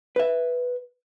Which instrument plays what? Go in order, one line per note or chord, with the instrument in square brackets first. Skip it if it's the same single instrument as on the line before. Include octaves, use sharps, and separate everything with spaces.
[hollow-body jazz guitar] B4 E5